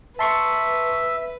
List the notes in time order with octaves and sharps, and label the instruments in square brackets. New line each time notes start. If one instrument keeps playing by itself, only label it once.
[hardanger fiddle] B4 [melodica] E5 [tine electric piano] A5 C6 C#6